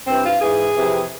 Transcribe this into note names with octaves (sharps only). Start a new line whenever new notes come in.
G2 E3 C4
F4
G#2 E3 G#4
F2 C3 E3